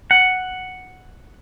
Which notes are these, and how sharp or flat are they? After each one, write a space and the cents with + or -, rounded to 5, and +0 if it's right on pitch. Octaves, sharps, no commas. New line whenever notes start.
F#5 +0